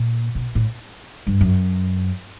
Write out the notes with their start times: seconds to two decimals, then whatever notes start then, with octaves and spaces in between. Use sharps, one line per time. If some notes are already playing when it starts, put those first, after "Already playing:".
Already playing: A#2
0.35 B2
0.55 A2
1.27 G2
1.41 F#2